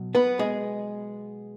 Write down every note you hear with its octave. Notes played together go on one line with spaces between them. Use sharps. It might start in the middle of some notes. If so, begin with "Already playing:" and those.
Already playing: B2 F#3
B3 B4
G#3 G#4